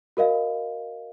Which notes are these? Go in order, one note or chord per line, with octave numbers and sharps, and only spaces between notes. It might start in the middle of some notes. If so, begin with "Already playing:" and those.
F#4 A#4 D#5 F5